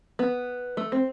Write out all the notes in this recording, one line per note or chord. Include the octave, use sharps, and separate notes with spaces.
B3
A3
C4